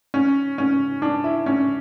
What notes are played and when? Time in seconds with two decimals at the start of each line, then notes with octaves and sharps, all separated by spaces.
0.14 C#4
0.58 C#4
1.02 D4
1.24 E4
1.46 C#4